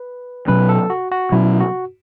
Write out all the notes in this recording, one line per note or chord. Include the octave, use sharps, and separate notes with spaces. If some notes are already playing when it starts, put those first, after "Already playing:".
Already playing: B4
B2 F#3 C#4 B4
A4
F#4
F#4
B2 F#3 C#4 E4
F#4